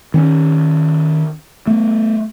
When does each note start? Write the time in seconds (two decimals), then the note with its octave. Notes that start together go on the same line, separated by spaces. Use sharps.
0.14 D#3 C4 C#4
1.67 A3 B3